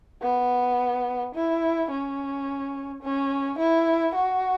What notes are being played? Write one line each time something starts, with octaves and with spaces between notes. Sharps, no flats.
B3
E4
C#4
C#4
E4
F#4